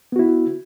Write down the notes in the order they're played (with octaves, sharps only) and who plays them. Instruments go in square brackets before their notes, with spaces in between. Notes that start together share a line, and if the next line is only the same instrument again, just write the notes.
[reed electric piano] B3
F#4
E4